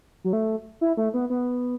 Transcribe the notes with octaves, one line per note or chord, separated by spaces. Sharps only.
F#3
A3
E4
A3
B3
B3